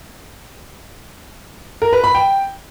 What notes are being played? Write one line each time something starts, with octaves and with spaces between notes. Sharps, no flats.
A#4
B4
B5
G5